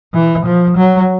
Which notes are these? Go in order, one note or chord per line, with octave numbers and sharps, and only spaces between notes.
E3
F3
F#3